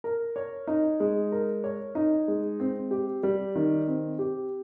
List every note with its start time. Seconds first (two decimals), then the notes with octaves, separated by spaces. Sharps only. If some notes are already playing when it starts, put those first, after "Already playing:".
0.04 A#4
0.36 C#5
0.67 D#4
1.00 G#3
1.32 A#4
1.64 C#5
1.95 D#4
2.28 G#3
2.60 C4
2.91 G4
3.23 G3
3.55 D#3
3.87 C4
4.19 G4